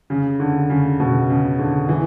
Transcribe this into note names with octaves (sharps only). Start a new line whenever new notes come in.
C#3
D3
C#3
B2
C#3
D3
E3